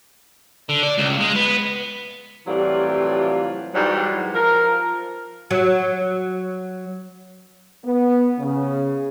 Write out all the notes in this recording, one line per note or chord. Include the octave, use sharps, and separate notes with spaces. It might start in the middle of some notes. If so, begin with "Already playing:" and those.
D3
D5
C#2
G#3
B3
A2 C3 E3 F#3 G3 F4
G#2 E3 F#3 G3
F3 A#4
F#3
B3
C#3